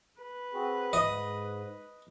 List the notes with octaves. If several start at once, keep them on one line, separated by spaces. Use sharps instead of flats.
B4
C4 F#4 G#4
G#2 D#5